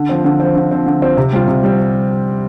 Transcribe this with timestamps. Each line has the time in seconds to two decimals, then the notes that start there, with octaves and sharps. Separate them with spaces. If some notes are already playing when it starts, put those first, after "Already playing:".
Already playing: D3
0.09 F3 C4
0.24 D3
0.40 F3 C4
0.55 D3
0.71 F3 C4
0.86 D3
1.02 F3 C4
1.17 C3
1.33 G3 C4 F4
1.48 C3
1.63 G3 C4